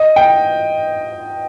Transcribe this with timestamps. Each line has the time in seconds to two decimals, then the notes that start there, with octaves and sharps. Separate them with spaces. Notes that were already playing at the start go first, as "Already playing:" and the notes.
Already playing: D#5
0.16 G5